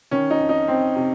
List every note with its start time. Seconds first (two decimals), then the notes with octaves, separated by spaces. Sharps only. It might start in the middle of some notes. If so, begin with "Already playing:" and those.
0.11 D#3 C#4
0.30 D#4
0.40 F2
0.49 D#4
0.68 F2 C4
0.96 C3